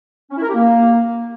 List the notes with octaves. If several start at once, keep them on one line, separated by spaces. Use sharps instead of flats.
C#4
E4
A#4
G4
A#3